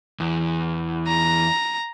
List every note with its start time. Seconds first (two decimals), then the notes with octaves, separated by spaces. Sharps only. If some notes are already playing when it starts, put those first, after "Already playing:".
0.20 E2
1.08 A#5